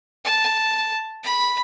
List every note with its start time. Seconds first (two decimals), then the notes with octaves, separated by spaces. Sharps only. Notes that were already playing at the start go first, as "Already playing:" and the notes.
0.24 A5
1.23 B5